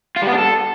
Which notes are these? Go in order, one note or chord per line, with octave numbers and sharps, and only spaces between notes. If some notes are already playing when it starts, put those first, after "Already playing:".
F4
G3
B3
D4
A4